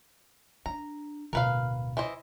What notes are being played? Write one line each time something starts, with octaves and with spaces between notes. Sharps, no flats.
D4 A#5
D1 B2 A#4 B4 F5
E3 C5 D#5